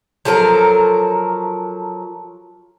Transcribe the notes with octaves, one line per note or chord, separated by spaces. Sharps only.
F3 F#3 A4 A#4